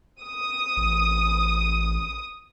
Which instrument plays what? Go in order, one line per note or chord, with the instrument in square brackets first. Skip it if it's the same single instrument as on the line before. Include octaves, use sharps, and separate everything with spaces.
[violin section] D#6
[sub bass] A1